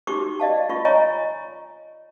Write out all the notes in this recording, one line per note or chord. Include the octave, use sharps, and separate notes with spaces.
D#4 F#4 G4 C#6 D6
D5 D#5 F5 A5
F4 C#6
C#5 D#5 G#5 A#5 C#6